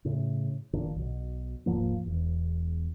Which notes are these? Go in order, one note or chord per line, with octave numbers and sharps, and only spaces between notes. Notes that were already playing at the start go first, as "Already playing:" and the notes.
A2 C#3
F#1 A#2 D#3 D4
B1 B2
D#1 G#2 F3 A#3
E1 E2